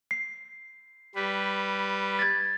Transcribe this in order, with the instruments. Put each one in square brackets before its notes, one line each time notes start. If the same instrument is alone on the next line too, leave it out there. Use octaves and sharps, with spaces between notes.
[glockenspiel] C7
[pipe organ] G3 B4
[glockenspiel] G#6 A6